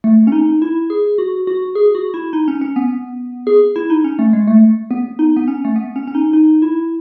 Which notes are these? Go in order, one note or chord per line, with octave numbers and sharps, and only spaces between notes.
A3
C#4
D#4
E4
G#4
F#4
F#4
G#4
F#4
E4
D#4
C#4
C#4
B3
G#4
E4
D#4
C#4
A3
G#3
A3
B3
D#4
B3
C#4
A3
B3
C#4
C#4
D#4
D#4
E4